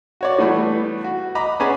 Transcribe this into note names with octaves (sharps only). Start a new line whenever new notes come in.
F#4 C#5 D5
E3 G3 A3 B3
F#4
D#5 A#5 B5 D6
B3 C#4 G#4 D5 G#5 B5